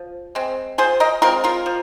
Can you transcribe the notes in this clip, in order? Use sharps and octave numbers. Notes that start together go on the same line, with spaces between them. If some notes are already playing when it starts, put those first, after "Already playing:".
Already playing: F3
G#3 C4
F3 G#4 C5
A#4 D#5
G#3 C4 F4 A#4
F4 A#4
F3